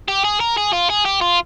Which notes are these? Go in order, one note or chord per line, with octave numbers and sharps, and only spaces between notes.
G4
G#4
A#4
G#4
F4
G#4
G4
F4